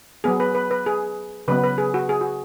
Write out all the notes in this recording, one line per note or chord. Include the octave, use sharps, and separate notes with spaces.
F#3 B3 G#4
B4
B4
B4
G#4
C#3 F#3 B3 B4
B4
G#4
F#4
G#4
F#4